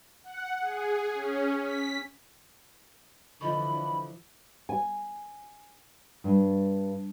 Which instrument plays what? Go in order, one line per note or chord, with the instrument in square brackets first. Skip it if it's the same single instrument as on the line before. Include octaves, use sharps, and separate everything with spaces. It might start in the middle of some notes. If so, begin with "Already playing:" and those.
[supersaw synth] F#5
G#4
C#4
B6
[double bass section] D3 E3 F3 [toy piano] F4 D#5 C#6 [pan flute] B5
[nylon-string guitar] G#5
G2